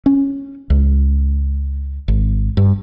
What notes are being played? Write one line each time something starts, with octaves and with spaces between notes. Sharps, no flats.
C#4
C#2
G#1
G2